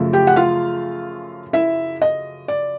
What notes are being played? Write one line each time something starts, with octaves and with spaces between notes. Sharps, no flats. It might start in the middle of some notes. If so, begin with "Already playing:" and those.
Already playing: F#2 C#3 F3 A3
G4 G5
F#5
F4 F5
E4 E5
D#5
D5